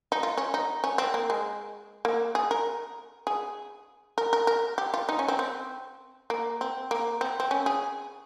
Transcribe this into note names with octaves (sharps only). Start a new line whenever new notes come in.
D#4
F4
C#4
D#4
C#4
C4
A#3
G#3
A#3
G#4
A#4
G#4
A#4
A#4
A#4
G4
F4
D#4
C#4
C4
C4
A#3
C4
A#3
C4
C4
C#4
G#4